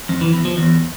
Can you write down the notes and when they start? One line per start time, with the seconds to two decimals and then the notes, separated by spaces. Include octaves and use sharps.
0.09 F2
0.21 E3
0.33 E2
0.45 F3
0.57 E2